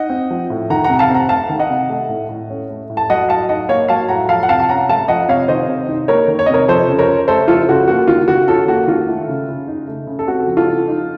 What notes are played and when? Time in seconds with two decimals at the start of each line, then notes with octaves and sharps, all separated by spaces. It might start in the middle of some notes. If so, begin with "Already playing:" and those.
Already playing: D#4 D#5 F#5
0.10 C4
0.30 F3
0.50 A2
0.70 D#3 F#5 A#5
0.84 F#5 A#5
0.90 C3
0.99 F5 A5
1.10 C4 F#5 A#5
1.29 A3 F5 A5
1.49 D#3
1.59 D#5 F#5
1.70 C3
1.90 A3
2.09 A2
2.29 A2
2.50 C#4
2.70 A3
2.90 A2
2.97 A5
3.09 F#3 D#5 F#5
3.29 A2 F5 A5
3.49 D#4 D#5 F#5
3.69 A#3 C#5 F5
3.88 F#3 F5 A5
4.08 A2 F#5 A#5
4.29 F3 F5 A5
4.43 F#5
4.49 C3 F5 A5
4.59 A5
4.69 C#4 F#5 A#5
4.89 A3 F5 A5
5.08 F3 D#5 F#5
5.28 C3 C#5 F5
5.48 D#3 C5 D#5
5.68 C3
5.88 D#4
6.08 A#3 A#4 C#5
6.28 D#3
6.39 C#5
6.46 C3 D#5
6.54 A#4 C#5
6.68 F3 A4 C5
6.88 C#3
6.98 A#4 C#5
7.08 C#4
7.28 A3 A4 C5
7.48 F3 F4 A4
7.69 C#3 F#4
7.88 A#3 F#4
8.08 D#3 F4
8.28 D#3 F#4
8.48 C#4 F4 A4
8.68 A#3 F#4
8.87 D#3 F4
9.08 A3
9.28 C#3
9.48 C#3
9.67 D#4
9.88 A3
10.07 C#3
10.19 A4
10.27 C4 F#4
10.47 F3
10.57 F4 A4
10.67 F3
10.87 D#4